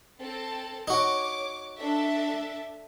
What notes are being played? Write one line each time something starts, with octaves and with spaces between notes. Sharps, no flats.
C4 A4 A5
D#4 F#4 C#5 D6
D4 A4 E5